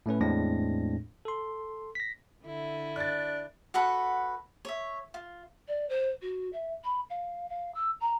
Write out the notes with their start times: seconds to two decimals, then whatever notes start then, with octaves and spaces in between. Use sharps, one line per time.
0.06 A2 A3 C#4 B4
0.21 E2 A2 G#3 C4 D4 A#6
1.25 A4 C6
1.95 A#6 B6
2.43 D3 E4
2.96 D4 F#6 A6
3.74 F#4 A4 B4 F#5
4.65 C#5 E5
5.14 F4
5.67 D5
5.89 C5
6.21 F#4
6.52 E5
6.83 B5
7.10 F5
7.49 F5
7.74 E6
8.00 A#5